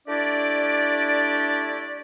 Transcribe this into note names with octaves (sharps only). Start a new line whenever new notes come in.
A3 D4 E4 G4 D5